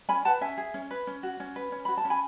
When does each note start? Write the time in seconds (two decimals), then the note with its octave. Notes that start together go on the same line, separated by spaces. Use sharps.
0.09 C#4 G#5 B5
0.25 B4 F#5 A5
0.41 C#4 E5 G#5
0.58 G#4
0.74 C#4
0.91 B4
1.07 C#4
1.23 F#4
1.40 C#4
1.56 B4
1.72 C#4
1.85 F#4 B5
1.97 A5
2.05 C#4
2.10 G#5 B5